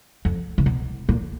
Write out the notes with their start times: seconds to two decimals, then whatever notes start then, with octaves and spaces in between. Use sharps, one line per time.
0.25 F2
0.58 C3
0.66 B2
1.09 A#2